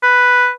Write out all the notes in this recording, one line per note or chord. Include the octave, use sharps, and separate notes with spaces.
B4